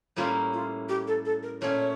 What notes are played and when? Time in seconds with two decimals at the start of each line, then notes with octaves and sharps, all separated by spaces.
0.16 A2 G3 A#3 C#4 E4 F4
0.53 F4
0.89 G4
1.08 A4
1.25 A4
1.43 A#4
1.61 A#2 A3 C#4 C#5